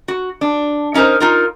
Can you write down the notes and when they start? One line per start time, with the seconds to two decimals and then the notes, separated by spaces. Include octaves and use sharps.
0.08 F#4
0.41 D4
0.94 C#4 D#4 G4 A#4 C5
1.20 D#4 F4 A#4